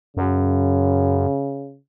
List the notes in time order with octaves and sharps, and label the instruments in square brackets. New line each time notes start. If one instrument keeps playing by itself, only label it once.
[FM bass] F#2 [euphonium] C#3